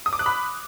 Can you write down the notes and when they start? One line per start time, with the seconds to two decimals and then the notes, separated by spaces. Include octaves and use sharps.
0.06 D#6
0.13 D6
0.19 F#6
0.26 B5